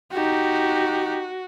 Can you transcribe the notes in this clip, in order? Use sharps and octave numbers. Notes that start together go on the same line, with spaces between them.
D#4 F#4 G4